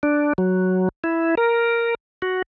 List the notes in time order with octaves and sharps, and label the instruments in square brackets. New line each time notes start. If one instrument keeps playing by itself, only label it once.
[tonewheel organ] D4
F#3
E4
A#4
F#4